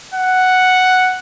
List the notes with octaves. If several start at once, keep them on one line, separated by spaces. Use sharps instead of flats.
F#5